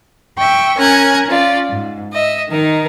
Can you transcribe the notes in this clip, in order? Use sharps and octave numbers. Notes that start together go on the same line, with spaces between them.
E5 G5 C#6
C#4 A#4 G#5 A#5 F#6 G#6
C#4 F4 D5
G#2
D#5 E5
D#3 D#4 A#4